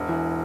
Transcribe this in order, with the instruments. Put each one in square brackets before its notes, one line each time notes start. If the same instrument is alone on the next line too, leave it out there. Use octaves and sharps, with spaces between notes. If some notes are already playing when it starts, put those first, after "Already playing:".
Already playing: [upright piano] E1
E3